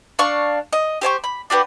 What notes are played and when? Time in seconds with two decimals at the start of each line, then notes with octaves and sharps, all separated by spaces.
0.19 D4 F5 C#6
0.73 D#5
1.01 G4 C5 G#5 C#6
1.24 B5
1.50 D4 F#4 G4 B4